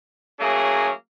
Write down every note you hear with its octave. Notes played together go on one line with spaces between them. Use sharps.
F#3 A3 A#3 C#4 G#4